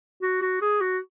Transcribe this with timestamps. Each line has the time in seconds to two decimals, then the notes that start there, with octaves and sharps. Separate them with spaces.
0.22 F#4
0.42 F#4
0.61 G#4
0.81 F#4